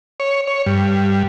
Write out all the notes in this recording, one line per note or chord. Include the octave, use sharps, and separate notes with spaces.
C#5
C#5
G2